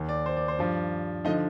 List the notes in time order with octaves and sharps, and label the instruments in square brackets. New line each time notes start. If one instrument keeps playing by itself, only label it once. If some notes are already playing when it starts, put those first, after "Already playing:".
Already playing: [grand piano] D#2 D#3
D5
C5
D5
C5
G2 F3 D5
D3 F3 D#4 D#5